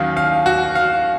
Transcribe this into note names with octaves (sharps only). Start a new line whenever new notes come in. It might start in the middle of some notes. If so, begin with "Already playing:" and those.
Already playing: D#2 D#3 F#3 C#4 F5
F5
F#4
F5